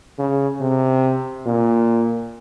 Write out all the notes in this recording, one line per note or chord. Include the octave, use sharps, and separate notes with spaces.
C#3
C3
A#2